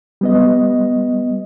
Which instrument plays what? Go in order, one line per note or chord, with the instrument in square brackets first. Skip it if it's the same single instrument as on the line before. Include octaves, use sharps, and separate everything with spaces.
[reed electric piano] G3 B3 D#5